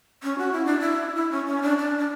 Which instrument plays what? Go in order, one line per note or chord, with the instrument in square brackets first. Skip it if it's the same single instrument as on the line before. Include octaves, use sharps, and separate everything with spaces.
[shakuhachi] C#4
F#4
E4
D4
E4
E4
C#4
C#4
D4
D4
D4